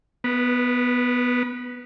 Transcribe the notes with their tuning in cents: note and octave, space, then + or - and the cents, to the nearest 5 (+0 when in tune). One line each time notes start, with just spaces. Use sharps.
B3 +0 B4 -35